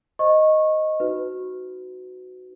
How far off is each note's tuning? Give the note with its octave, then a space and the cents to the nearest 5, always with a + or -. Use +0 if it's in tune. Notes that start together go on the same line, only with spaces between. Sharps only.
C5 +0 D#5 +0 C#6 -20
D#4 +0 F#4 +0 B4 +30